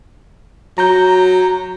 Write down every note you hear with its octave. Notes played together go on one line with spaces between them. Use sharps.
F#3 A#5 G6